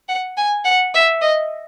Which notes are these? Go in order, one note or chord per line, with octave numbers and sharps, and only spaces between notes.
F#5
G#5
F#5
E5
D#5